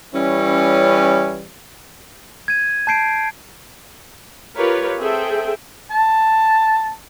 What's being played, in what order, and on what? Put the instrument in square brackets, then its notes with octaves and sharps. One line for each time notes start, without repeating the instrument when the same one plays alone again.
[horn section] E3 G3 C#4
[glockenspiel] G#6 D#7
A5 G6 C7 D7
[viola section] F4 G4 A#4 B4 C#5
C4 G#4 A4 E5 G5
[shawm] A5